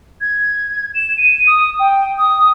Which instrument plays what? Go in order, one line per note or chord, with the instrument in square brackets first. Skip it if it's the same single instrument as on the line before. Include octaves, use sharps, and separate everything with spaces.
[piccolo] G#6
E7
D#7
D#6
G5
D#6